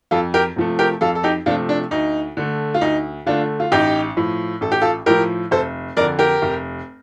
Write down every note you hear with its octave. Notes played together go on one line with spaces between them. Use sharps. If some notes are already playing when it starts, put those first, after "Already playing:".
F2 F4 A4
G4 A#4
C3 F3 A3
G4 A#4
F2 F4 A4
A4
D#4 G4
C3 F3 A3 D4 F4
D4
D2 D#4
D3 A3
F4
D2 D#4
D3 A3 D4 F4
F4
A1 D#4 G4
A2 F3
A1 A4
G4
F4 A4
A2 F3 G4 A#4
F1 A4 C5
F2 D3 A#4 D5
G4 A#4
F1